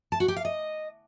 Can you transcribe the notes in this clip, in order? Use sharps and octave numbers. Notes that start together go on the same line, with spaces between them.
A5
F#4
G4
F5
D#5